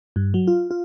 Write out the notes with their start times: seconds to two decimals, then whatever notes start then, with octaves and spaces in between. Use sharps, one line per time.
0.16 G2
0.34 F#3
0.47 F4
0.71 F4